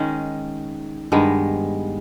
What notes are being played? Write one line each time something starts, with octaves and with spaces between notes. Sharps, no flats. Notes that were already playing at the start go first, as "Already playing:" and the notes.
Already playing: D#3 G#3 C#4
G2 D#3 G#3 B3